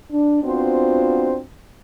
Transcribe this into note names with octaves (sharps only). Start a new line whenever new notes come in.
D4
B3 C4 D4 F4 F#4 C5